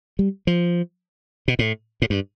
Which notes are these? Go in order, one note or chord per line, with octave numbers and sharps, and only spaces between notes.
G3
F3
B2
A2
A2
G2